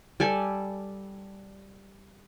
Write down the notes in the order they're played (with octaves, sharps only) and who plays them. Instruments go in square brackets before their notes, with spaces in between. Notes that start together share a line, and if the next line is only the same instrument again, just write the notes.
[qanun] G3 A4 G#5